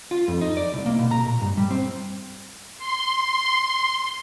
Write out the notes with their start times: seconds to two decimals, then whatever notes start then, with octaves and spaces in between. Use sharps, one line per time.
0.11 F4
0.28 F2
0.41 D#4
0.57 D5
0.73 C2
0.86 A#3
0.99 B2
1.11 A#5
1.26 A#2
1.41 G2
1.57 G3
1.71 C4
2.78 C6